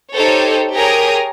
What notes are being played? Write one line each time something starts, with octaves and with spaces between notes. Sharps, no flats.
D#4 G4 A4 C5 C#5
G4 G#4 A#4 C#5 A#5 D#6